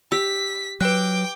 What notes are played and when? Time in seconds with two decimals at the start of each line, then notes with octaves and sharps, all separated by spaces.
0.12 G4 E6 B6
0.81 F#3 B4 G5 D6 F#6